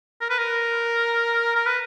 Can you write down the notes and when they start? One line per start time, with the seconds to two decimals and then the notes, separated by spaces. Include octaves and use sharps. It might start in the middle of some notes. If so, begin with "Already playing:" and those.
0.21 A#4
0.30 B4
0.38 A#4
1.55 A#4
1.66 B4